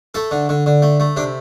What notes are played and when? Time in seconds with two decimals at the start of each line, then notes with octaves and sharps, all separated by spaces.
0.14 A3 A4
0.31 D3
0.49 D3
0.66 D3
0.82 A3
1.00 A3
1.17 C3 D4